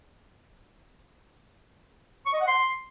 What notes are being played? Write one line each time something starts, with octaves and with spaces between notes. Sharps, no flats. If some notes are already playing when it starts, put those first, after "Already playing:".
C#6
D#5
F#5
C6